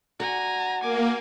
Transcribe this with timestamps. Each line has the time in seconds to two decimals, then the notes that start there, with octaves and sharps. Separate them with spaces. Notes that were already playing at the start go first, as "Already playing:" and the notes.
0.20 F#4 D5 F#5 G#5 A#5
0.82 A#3 G#5 D6